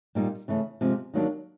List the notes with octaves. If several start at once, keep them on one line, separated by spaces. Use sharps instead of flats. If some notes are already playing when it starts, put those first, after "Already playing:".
A#2 G3 A#3 D#4
C#3 E3 A3 C#4
C3 F3 G#3
D#3 F#3 A#3 D4 G4